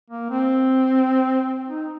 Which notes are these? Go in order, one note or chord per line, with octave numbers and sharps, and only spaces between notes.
A#3
C4
D#4